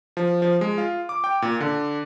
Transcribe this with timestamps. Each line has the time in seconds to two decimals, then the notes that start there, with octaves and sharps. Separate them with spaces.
0.17 F3
0.42 F3
0.61 G#3
0.78 F4
1.09 D6
1.24 G5
1.42 A#2
1.60 D3